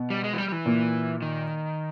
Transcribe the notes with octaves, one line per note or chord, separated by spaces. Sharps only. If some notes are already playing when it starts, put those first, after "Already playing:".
Already playing: B2
G3
G#3
E3
G3
G3
E3
A#2
D#3